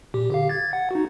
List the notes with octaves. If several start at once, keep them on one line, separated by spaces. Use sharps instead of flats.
A#2 G4
D3 G4 F5
G#6 A6
F#5
D#4 F#4